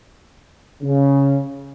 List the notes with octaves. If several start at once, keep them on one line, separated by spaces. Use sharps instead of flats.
C#3